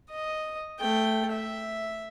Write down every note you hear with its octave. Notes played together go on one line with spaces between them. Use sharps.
D#5
A3 G5
E5